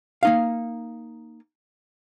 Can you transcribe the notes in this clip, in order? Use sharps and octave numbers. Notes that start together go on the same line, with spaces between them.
A#3 D#4 F5